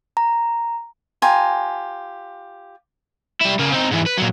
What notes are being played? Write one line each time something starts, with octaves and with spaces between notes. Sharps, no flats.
A#5
F4 G4 G#5 A#5
G3 E4
C#3 A#3
C4 D#4
G#2 E3
B4
A#2 F#3